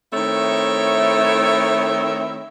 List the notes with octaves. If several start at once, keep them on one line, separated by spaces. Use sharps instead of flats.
D#3 A3 C4 E4 C#5 E5